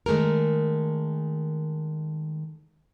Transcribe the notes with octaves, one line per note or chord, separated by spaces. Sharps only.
D#3 G#3 A3 G#4 A#4